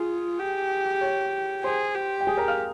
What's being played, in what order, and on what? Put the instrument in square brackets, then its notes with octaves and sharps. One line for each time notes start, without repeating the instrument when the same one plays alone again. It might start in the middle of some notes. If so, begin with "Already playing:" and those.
Already playing: [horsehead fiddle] F4 [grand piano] G#4 G#5
[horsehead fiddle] G4
[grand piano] C#5
[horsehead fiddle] G#4 [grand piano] C5 C6
[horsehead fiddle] G4
[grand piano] G5
G#4 G#5
A#4 A#5
F5 F6